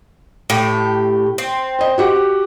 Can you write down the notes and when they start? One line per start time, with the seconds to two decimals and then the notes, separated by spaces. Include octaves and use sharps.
0.50 A2 G4
1.38 C4
1.79 C5 D#5
1.98 F#4 G4 F#5